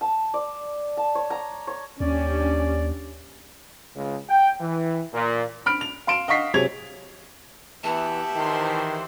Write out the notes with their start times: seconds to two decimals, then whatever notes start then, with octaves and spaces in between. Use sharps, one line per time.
0.01 A5
0.34 D5
0.97 A5
1.15 C#5
1.30 A#5
1.67 C#5
2.00 D#2 C#4 D4 G4 D5
3.96 C#2
4.30 G5
4.60 E3
5.13 A#2
5.66 B5 F6 D7
5.81 F7
6.07 F5 C6 D7 E7
6.28 D#5 F5 F#5 C#6 B6 C7
6.54 C3 F#3 G#4 C#5 G#6 F7
7.84 E3 B3 F#4 G4 E5 A5
8.36 D#3 E3 C5 C6